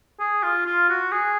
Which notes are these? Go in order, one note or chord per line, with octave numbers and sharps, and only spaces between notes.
G#4
F4
F4
F#4
G#4